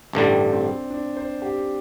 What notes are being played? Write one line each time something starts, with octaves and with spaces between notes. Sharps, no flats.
A1 G2 D3 G3 D4
C4
D4
C5
G4